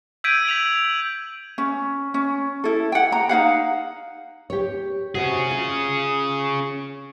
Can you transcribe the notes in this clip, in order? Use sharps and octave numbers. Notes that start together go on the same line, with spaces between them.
E6 G6 G#6 B6 D7 D#7
B6 D7 F7 F#7
C#4
C#4
E4 A4
F#5 G5
A#5
D#4 C5 F5 F#5
G4 C#5
C3 C#4 F#4 G#4
F4